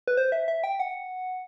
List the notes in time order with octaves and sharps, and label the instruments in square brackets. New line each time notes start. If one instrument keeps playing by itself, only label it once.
[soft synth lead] B4
C5
E5
E5
G5
F#5